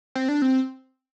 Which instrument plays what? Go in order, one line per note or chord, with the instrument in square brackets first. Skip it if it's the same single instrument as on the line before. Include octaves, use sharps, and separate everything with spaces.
[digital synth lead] C4
D4
C4